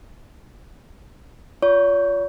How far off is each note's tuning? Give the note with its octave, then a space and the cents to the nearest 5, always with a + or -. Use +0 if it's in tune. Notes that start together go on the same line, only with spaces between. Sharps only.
F4 +0 C#5 +45 C#6 +0